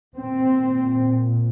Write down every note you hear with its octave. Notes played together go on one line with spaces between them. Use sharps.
A#2 C4